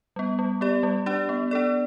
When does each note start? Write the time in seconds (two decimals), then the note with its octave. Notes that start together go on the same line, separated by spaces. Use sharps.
0.16 G3 B3
0.39 G3
0.61 B3 G4 D5
0.83 G3
1.06 D4 G4 D5
1.29 B3
1.51 D4 A4 D5